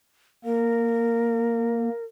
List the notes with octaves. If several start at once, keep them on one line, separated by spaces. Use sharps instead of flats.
A#3 A#4